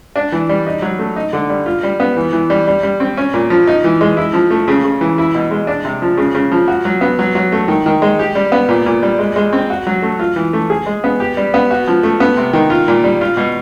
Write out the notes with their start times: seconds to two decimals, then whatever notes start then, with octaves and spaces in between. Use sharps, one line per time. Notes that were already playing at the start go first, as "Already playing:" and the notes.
0.16 D4
0.32 E3
0.49 G3
0.66 D#4
0.82 F#3
0.99 A3
1.16 D#4
1.33 D3
1.50 G3
1.66 F4
1.83 G3
2.00 B3
2.17 E3
2.33 E3
2.50 G3
2.67 G3
2.83 G3
3.00 C4
3.17 C#4
3.34 A#2
3.50 F3
3.67 D#4
3.84 E3
4.01 G#3
4.17 E4
4.33 F3
4.51 A3
4.68 C#3
4.84 C#3
5.01 E3
5.18 E4
5.35 B2
5.51 G#3
5.67 D4
5.85 C3
6.02 F3
6.17 C#3
6.34 C#3
6.52 F3
6.68 F#4
6.85 F#3
7.01 B3
7.19 F#3
7.35 F#3
7.52 A3
7.68 D#3
7.86 D#3
8.02 G#3
8.19 G4
8.35 G3
8.52 B3
8.69 A#2
8.86 A#2
9.03 G3
9.19 G#3
9.36 G#3
9.53 C4
9.70 F#4
9.87 F#3
10.02 A3
10.19 F4
10.36 E3
10.53 A3
10.70 G#4
10.86 G#3
11.04 B3
11.20 G4
11.37 G3
11.54 B3
11.71 F#4
11.88 F3
12.03 A3
12.20 B3
12.37 C3
12.53 D#3
12.70 F4
12.88 A#2
13.04 G3
13.21 F4
13.37 B2